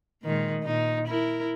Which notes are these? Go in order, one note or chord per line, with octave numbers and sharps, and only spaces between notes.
A#2 D#3 G#3
A#2 D#4
E4 A#4